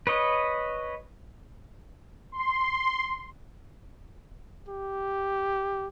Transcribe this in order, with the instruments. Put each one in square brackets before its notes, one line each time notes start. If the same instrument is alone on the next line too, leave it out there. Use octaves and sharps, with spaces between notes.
[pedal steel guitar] B4 C#5 D#5
[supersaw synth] C6
[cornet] G4